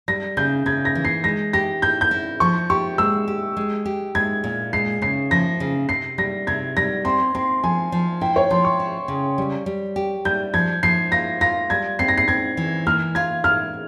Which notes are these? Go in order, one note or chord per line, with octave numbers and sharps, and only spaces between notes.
G3 A#6
C#3 G6
C#3 G#6
A#6
E3
C7
G#3 A#6
G4 A#6
E4 G6
G6
E4
F3 C#6
G4 C#6
G#3 E6
G4
G#3
G4
G#3 G#6
A#2
G#3 C7
C#3 C7
F3 A#6
C#3
C3 C7
G3 A#6
C3 G#6
G3 A#6
C4 C6
C4 C6
F3 G#5
F3
E4 G5
C#5
F3 C6
C#6
E4
C#3
G3
G3
G4
G3 G6
F3 G#6
F3 C7
F4 A#6
F4 A#6
G3 G#6
C4 C7
A#6
C7
C4 G#6
E3
A#3 F6
F4 G#6
A#3 F6